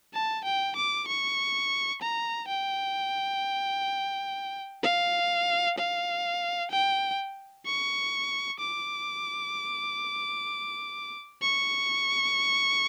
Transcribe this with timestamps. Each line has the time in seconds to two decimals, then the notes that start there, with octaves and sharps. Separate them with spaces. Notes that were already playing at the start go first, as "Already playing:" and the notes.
0.13 A5
0.44 G5
0.76 D6
1.08 C#6
2.02 A#5
2.48 G5
4.83 F5
5.78 F5
6.71 G5
7.66 C#6
8.59 D6
11.42 C#6